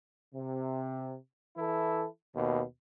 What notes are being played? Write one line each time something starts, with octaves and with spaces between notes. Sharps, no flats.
C3
E3 E4 A4
D#2 B2